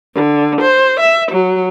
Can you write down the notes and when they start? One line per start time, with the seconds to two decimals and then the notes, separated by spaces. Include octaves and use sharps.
0.14 D3
0.61 C5
1.00 E5
1.31 F#3